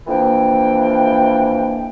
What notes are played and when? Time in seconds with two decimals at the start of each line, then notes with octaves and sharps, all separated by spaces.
0.07 F2 E3 F3 A#3 D4 G5